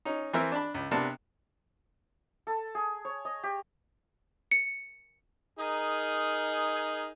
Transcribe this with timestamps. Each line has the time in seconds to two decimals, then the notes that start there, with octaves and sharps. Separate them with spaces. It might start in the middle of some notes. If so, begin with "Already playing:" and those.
0.05 C#4 D#4
0.33 E3 C4 A#4 E5
0.52 D4 A5 B5
0.74 C#2
0.91 C3 B3 D4 A#4 A5
2.47 A4
2.75 G#4
3.05 C#5
3.25 D#5
3.43 G4
4.51 C#7
5.59 D#4 G#4 A#4